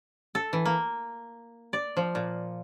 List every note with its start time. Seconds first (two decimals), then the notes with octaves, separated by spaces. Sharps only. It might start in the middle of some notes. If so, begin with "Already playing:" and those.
0.35 A4
0.53 E3
0.65 A#3
1.73 D5
1.97 F3
2.15 A#2